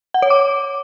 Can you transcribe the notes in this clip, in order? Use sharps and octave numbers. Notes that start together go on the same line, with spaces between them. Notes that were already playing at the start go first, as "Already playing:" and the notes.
F#5
C#5
D6